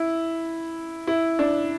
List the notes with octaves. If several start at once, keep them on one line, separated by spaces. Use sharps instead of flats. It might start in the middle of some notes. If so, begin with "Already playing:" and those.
Already playing: E4
E4
D4